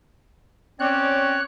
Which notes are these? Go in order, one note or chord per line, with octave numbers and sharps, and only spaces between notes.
C4 C#4 C#5 D5 F#6